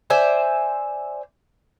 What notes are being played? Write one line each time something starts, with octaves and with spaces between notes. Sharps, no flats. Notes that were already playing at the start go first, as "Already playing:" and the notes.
C5 D5 E5 G#5